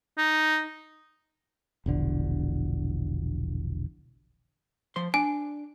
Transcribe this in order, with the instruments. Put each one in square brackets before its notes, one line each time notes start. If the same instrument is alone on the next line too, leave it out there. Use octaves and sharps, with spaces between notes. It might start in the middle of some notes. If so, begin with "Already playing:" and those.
[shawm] D#4
[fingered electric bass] E1 A#1 D3
[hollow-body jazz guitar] F3 C5 C6
[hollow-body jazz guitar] D4 [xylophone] G#5